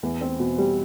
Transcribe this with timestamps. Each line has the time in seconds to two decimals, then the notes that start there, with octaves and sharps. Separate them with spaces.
0.03 E2
0.21 C4
0.40 B2
0.58 G3